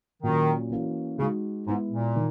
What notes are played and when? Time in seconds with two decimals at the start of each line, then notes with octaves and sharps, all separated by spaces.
0.23 A#2 D#3 F#3 C#4
0.70 E3 A#3 C#4 F#4
1.19 C#3 G#3 D#4 F#4
1.67 G#2 G#3 B3 E4
1.91 A#2
2.16 D#3